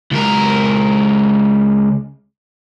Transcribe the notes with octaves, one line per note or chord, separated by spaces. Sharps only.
C#2 A#4